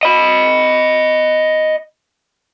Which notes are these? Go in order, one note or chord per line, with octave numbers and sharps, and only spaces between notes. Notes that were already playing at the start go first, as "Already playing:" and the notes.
D#5 B5